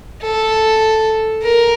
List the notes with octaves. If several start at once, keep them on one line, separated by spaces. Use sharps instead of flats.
A4
A#4